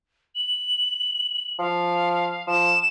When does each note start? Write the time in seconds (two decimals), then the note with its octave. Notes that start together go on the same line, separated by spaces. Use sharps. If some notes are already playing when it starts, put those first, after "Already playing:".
0.35 F#7
1.59 F3 F5
2.47 F3 E7